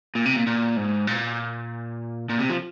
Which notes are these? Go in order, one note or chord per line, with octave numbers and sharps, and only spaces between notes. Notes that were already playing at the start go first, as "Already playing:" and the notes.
A#2
C3
A#2
A#2
G#2
A#2
A#2
C3
F3